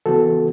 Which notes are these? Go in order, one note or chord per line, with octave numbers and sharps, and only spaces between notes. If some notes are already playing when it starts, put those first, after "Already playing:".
C#3 E3 B3 F#4 A4